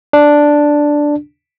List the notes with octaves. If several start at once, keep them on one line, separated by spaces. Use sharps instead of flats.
D4